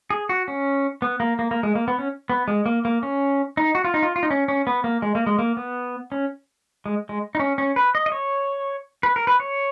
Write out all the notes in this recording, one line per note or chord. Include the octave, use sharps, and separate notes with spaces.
G#4
F#4
C#4
B3
A#3
A#3
A#3
G#3
A#3
B3
C#4
B3
G#3
A#3
A#3
C#4
D#4
F#4
F4
D#4
F4
F4
D#4
C#4
C#4
B3
A#3
G#3
A#3
G#3
A#3
B3
C#4
G#3
G#3
D#4
C#4
C#4
B4
D#5
D#5
C#5
B4
A#4
B4
C#5